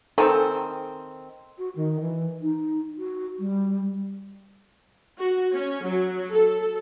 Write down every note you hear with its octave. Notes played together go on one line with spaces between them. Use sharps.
D#3 C4 A4 G#5 A5
F#4
D#3
E3
D#4
F#4
G3
F#4
C#4
F#3
A4